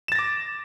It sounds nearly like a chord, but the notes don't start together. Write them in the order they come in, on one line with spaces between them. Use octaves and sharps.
E7 A6 A#6 D6